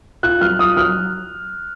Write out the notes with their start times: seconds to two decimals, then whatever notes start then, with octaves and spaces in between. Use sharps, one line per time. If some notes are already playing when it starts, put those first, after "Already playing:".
0.23 F4 F#6
0.41 F#3 F6
0.59 F4 D#6
0.76 F#3 F6